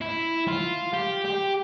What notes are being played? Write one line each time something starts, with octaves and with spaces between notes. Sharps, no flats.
E4
F4
G4
G4